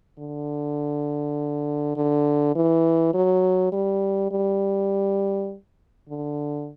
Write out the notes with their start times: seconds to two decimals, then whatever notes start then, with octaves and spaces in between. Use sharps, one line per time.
0.19 D3
1.96 D3
2.55 E3
3.14 F#3
3.72 G3
4.31 G3
6.09 D3